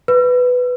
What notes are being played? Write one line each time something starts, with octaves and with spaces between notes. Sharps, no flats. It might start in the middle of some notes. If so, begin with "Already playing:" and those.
B4